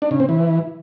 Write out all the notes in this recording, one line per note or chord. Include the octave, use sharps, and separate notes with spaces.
D4
C#3
C4
E3